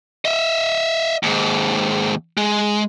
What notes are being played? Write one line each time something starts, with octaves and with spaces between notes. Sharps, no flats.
D#5 E5
D#2 G#2
G#3